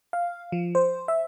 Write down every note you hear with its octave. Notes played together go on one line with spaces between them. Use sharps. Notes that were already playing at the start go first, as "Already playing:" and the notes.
F5
F3
C5
E5